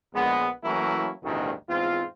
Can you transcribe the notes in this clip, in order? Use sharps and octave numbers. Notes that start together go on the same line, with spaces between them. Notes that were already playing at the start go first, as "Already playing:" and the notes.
A#1 G#3 B3
E3 F#3 A3 A#3 C#4 E4
A1 D2 G2 B2 D#3
E2 G#2 C4 F4